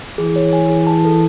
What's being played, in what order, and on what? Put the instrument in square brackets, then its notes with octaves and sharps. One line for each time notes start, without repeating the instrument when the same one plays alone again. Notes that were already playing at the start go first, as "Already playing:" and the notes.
[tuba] E3 [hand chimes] G#4
[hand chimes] C#5
G#5
G#4
A5
A4